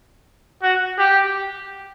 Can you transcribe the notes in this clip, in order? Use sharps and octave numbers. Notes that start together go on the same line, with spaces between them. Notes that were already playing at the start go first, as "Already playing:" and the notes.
F#4
G4